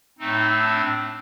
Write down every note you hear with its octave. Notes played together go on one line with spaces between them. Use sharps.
A2 A3 C4 D#4
D4